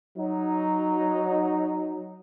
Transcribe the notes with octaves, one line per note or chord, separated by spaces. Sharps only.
F#3 D#4